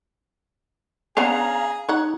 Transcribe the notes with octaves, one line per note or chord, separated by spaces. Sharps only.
B3 C#4 D4 G#4 F5 A#5
D#4 C#5 F#5